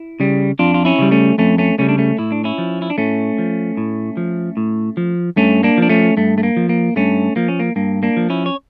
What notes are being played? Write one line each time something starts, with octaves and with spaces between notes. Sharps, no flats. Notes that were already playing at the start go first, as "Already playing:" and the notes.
Already playing: E4
C#3 G3
F2 D4 F4
F4
C#4 E4
C#3 G3
A3 C#4
F2 A3 C#4
A3 C#4
C#3 G3 A3 C#4
D4
A3 C#4
A2 E4
D4
C#4 E4
F3
E4
D4
A2 A3 C#4
F3
A2
F3
A2
F3
G2 A3 C#4
A#3 D4
F3 D4
A3 C#4
G2 A3
A3
A#3
F3
A#3
G2 A3 C#4
F3 A#3
C#4
A#3
G2 A#3
A#3 D4
F3
C#4 E4
C#5